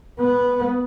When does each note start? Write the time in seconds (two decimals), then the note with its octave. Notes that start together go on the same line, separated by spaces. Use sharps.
0.19 B3